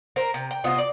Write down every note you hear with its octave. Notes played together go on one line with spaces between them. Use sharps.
A#4 C5
C3
G5
C3 B3 F4 D#5
D5